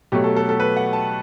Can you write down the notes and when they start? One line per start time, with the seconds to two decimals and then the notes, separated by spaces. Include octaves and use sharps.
0.12 B2 F#3 A3 G4
0.24 A4
0.36 A4
0.49 A4
0.60 B4
0.77 F#5
0.93 A5